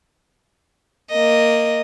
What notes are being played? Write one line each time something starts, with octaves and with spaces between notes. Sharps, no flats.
A#3 D#5